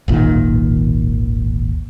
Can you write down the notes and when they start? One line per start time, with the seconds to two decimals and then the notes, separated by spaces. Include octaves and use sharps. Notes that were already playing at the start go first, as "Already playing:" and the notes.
0.08 D1 G#1 A#2 D#3